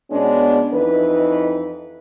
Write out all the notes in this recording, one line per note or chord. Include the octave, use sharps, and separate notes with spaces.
B2 G#3 B3 C#4 D4
F2 E3 D#4 B4